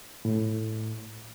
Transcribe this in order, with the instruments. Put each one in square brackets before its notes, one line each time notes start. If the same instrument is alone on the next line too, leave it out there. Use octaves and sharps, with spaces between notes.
[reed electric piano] A2